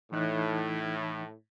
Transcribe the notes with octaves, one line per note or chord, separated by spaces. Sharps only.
A2 E3 D#4 F#6